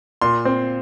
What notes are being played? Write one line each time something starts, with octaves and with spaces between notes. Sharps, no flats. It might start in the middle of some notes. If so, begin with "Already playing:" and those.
A#2 C6
C4